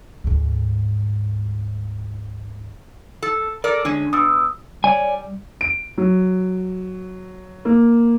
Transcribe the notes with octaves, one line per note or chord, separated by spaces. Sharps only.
D2 G#2
A4
A4 A#4 D5
D3 G#3 C#4 D4
B2 D#6 E6
G3 C#5 D5 G#5
D7
F#3
A#3